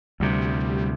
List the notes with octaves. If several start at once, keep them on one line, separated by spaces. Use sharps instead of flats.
D2 C3 G3